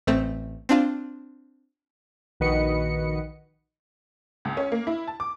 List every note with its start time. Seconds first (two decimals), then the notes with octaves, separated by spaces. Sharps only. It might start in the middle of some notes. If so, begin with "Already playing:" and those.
0.07 A1 A3 C4
0.69 C4 D4 F4
2.40 A#1 D#3 F#4 B4 D#5 C#7
4.45 C#2
4.57 C#4
4.72 A#3
4.87 E4
5.07 A5
5.20 D6